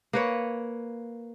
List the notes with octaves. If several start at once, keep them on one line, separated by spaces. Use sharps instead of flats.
A#3 B4 C#5